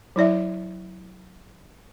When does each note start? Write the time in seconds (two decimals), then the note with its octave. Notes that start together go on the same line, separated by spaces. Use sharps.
0.16 F#3 E4 D5 E5